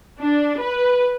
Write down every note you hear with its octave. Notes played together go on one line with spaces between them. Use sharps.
D4
B4